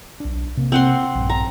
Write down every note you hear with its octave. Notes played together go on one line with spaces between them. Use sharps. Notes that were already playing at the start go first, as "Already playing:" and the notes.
B1 D4
C3 A#3
C4 F#5 C6
A#1 G2
A#5